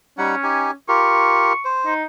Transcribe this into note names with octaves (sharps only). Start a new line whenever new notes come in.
G3 C#4 D#4 F#5
D#4 G4 G#5
F4 G4 A#4 C#6
C5
D#4